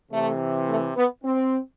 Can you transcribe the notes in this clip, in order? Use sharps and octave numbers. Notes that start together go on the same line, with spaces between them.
C3 E3 A3
A3
B3
C4